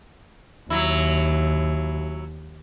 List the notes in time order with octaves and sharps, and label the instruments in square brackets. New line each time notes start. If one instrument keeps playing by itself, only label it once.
[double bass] D#2 [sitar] F#3 E4